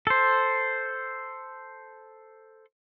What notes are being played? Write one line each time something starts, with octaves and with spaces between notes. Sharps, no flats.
A4 C5